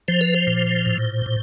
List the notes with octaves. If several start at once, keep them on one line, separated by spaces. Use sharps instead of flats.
F3 C5
B4
C5
A#2
A2
A2